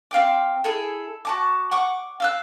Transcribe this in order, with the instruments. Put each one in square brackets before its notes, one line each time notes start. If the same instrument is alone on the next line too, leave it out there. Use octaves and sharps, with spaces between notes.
[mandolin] C4 F5 G5 D6
E4 G#4 A4
F#4 A5 D6
F#5 C#6 D6
F5 E6 F#6